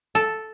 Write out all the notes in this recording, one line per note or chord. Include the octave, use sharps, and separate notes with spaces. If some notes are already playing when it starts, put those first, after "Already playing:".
A4